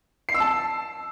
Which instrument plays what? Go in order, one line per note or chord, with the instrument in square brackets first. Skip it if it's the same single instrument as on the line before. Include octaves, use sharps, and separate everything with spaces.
[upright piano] C7
E6
A5